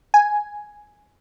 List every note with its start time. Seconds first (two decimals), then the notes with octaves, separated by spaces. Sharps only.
0.14 G#5